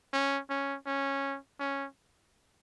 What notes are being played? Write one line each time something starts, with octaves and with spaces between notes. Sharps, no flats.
C#4
C#4
C#4
C#4